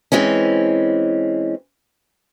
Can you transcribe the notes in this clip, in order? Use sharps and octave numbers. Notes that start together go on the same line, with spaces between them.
E3 G#3 C4 C#4